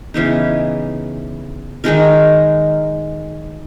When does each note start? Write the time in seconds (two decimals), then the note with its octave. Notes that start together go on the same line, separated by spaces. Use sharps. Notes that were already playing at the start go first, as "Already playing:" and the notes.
0.14 C#3 E3 B3 D#4
1.84 D#3 G#3 D#4 A#4